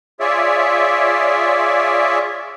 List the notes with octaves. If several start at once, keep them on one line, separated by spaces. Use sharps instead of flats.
F4 G#4 C#5 D5 E5